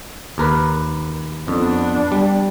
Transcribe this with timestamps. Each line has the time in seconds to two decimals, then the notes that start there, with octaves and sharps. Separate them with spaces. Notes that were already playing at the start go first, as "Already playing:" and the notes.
0.38 D#2 A#4 B4
1.48 F2 B3 D4
2.12 G3